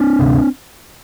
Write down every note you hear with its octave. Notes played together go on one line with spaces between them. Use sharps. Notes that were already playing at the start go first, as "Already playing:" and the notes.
Already playing: C4 D4
D2 C3